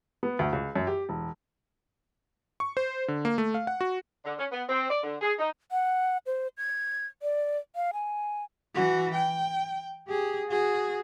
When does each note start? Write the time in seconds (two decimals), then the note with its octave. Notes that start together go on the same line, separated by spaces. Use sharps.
0.23 B3
0.39 D2
0.53 C#2
0.76 F#2
0.87 G4
1.09 E1
2.60 C#6
2.77 C5
3.08 D3
3.25 A#3
3.38 A3
3.54 F5
3.67 F#5
3.81 F#4
4.25 D3
4.38 C#4
4.51 B3
4.69 C4
4.90 D5
5.03 D3
5.21 G#4
5.39 D#4
5.72 F#5
6.26 C5
6.58 G#6
7.22 D5
7.76 F5
7.93 G#5
8.75 E3 F#4
9.15 G5
10.08 G4 G#4
10.48 F#4 G#4